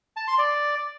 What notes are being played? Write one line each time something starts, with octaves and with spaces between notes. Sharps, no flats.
A5
C6
D5